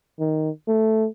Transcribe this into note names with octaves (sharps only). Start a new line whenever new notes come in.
D#3
A3